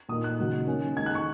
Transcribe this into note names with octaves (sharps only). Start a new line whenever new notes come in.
A#2 A#3 D#4 D#6
F#6
C#3 F#3 D#4
D#3 A#3 C#4
D#3 G#3 D#4 G#6
F#6
C#6